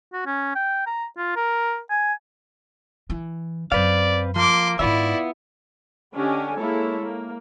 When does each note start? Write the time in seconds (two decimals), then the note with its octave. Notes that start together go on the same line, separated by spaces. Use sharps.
0.13 F#4
0.26 C#4
0.55 G5
0.87 A#5
1.17 F4
1.36 A#4
1.90 G#5
3.10 E3
3.72 F#2 F#3 C4 B4 D5 F5
4.36 F3 A#3 C6 D6
4.79 G#2 D#3 B3 E4 F4 D5 E5
6.14 D3 C#4 D4 G4 D#5 G#5
6.57 G#3 A#3 E4 A4 C#5
7.00 A#3